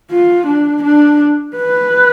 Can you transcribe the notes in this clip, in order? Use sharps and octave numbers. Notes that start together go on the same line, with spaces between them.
F4
D4
D4
B4